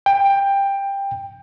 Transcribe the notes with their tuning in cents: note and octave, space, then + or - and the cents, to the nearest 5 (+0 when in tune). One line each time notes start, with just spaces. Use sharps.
G5 +15